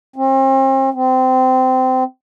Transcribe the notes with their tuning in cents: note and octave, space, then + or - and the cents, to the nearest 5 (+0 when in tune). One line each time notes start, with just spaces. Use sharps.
C4 +40
C4 -20